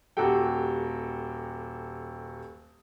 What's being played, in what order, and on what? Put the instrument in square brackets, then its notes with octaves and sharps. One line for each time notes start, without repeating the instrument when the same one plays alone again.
[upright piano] D#1 F#4 G4 A4 G5